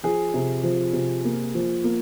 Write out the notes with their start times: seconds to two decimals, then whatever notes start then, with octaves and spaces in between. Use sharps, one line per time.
0.03 F3 G#4
0.34 C3
0.63 F3
0.93 C3
1.24 A#3
1.54 F3
1.84 A#3